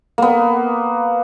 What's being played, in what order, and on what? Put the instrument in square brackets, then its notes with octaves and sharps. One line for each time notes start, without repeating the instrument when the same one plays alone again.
[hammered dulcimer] A#3 B3